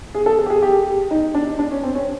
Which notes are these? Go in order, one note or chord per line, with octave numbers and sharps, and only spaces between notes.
G#4
A4
A4
G4
G#4
G4
D#4
D4
D4
C#4
C4
C#4